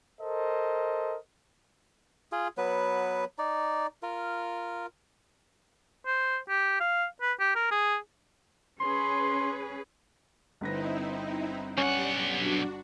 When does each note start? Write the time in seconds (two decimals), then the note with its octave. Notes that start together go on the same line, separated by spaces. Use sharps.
0.19 A4 A#4 C5 D#5
2.32 F4 G#4
2.58 F#3 B3 B4
3.38 D#4 D5
4.03 F4 A#4
6.06 C5
6.49 G4
6.80 F5
7.22 B4
7.40 G4
7.56 A#4
7.71 G#4
8.80 C#4 G#4 B4 C6
10.61 G1 C4 D#4 E4 B4 A#6
11.78 B1 C#4 G4 D5 F#5
12.35 D4 F#4